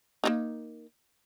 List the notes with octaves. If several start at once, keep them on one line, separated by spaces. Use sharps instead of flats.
A#3 D4 D#4